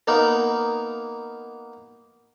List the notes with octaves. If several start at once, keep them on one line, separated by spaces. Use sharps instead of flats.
A#3 B3 D#4 A#4